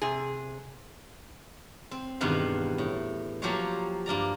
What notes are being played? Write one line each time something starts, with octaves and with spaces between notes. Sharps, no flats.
C3 G#4
C4
E2 G2 B2 D#3 B3 F5
A2
F3 F#3 A#3 G4 C5 C#5
G2 A#3 D5 A#5